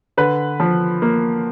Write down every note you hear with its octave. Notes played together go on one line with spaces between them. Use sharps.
D3 B4
F3
A#3